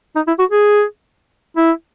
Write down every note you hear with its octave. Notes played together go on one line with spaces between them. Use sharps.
D#4
E4
F#4
G#4
E4